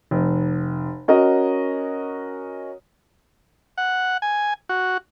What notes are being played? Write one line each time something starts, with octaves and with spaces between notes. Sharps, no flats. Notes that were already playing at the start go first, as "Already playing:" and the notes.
F1
C#4 F#4 A#4 D#5
F#5
G#5
F#4